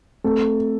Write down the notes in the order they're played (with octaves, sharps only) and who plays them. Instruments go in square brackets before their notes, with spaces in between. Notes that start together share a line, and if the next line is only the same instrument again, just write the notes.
[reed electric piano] A3 C4 [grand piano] A4